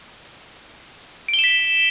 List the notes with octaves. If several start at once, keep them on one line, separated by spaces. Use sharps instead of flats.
D7
G7
E7
B6